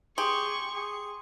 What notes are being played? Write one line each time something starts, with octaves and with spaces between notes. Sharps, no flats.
G4 G#4 C6 C#6
G#4